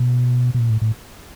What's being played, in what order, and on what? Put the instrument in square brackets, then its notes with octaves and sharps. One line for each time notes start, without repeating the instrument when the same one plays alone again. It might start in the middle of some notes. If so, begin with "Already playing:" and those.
Already playing: [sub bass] B2
B2
A#2
A2
A2